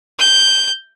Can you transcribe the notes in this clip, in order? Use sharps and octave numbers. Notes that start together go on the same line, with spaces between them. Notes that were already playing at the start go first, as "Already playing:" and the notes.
G6